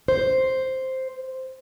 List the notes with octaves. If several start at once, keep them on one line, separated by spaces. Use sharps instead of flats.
C5